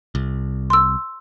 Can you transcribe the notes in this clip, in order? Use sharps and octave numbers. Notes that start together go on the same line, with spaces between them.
C2
C6 E6